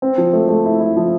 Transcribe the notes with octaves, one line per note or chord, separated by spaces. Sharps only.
C4
F3
A3
A3
E4
E4
F3